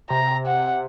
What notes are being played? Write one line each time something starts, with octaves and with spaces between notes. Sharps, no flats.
C3 A#5
F#5